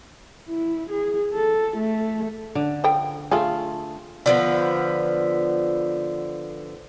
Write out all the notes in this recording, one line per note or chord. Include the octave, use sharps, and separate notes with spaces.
E4
G#4
A4
A3
D3
F3 A4 G5
A3 F4 G#4 A4 G#5
D3 F3 B3